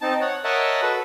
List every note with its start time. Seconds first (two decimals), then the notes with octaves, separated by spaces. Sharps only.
0.01 C4 D#4 A5
0.21 C#5 F#5
0.44 A#4 C#5 D#5 E5 F#5 A5
0.82 F#4 A4 B4